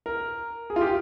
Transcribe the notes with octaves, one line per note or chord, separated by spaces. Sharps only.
A#4
G#4
F4
G4